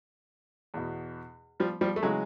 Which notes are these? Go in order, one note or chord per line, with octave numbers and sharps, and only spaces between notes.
E2 B2
F3 G3
F3 G3
A3
C#3 E3 F#3 G#3